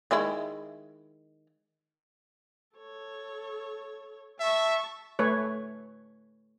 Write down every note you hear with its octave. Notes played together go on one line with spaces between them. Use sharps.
D#3 G#3 E4
A4 C#5
E5 A5 C#6
A3 B4 C#5